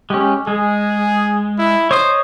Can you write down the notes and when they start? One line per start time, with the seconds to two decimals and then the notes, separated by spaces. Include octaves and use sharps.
0.10 G#3 C#4 G4
0.47 G#3 G#4
1.59 E4
1.91 C5 C#5 D#5 D#6